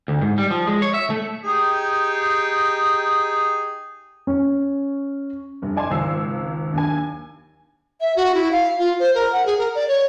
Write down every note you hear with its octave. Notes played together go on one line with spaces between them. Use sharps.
D2
G#2
G3
F3
G#3
C#5
E5
A3
D#4 G4 G#4
C#4
F1 G2
D5 G#5 A5 C6
G#1 C#2 E6 C7
D#2 D4 G#5
E5
F#4
E4
F5
F4
C5
A#4
F#5
G#4
A#4
D5
C#5